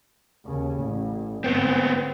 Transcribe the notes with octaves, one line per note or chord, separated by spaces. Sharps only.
D#2 C#3
A1
G1 G#2 B3 C4